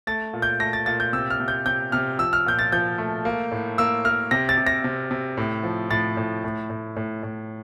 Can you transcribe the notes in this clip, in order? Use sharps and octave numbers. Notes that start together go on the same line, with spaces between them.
A3 A6
A#2
G6
A3 A#6
A6
A#2 A6
G6
C3 E6
F6
C3
G6
C3 G6
C3 F6
F3 E6
F6
A#2 G6
A6
F3 G6
A3
A#3
A2
A#3 E6
A#3 F6
C3 A#6
A6
C3
A#6
C3
C3
A2
F3
A2 A6
A2
A2
A2
A2
A2